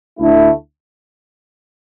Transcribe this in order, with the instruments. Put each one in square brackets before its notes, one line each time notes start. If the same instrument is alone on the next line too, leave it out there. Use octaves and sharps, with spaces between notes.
[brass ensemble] D2 D3 A3 E4